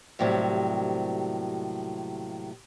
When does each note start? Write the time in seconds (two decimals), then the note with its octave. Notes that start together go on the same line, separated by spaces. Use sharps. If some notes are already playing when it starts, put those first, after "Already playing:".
0.19 D#2 A2 C3 F#3 G3 C4